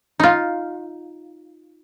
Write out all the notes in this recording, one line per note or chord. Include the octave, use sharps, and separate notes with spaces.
D#4 F4